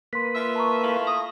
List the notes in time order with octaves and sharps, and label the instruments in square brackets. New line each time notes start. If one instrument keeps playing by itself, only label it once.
[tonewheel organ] A#3 B4 [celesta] C6 B6
[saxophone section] F4 E5
[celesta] A5 A#5 C#6
[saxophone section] A3 E4 F4
[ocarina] D#6 [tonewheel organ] A#6